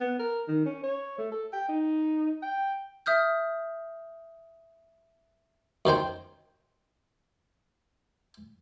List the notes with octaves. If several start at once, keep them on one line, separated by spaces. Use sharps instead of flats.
B3
A#4
D#3
C#4
C#5
A3
A4
G5
D#4
G5
E5 D#6 F6 G6
F#2 D#3 C5 G5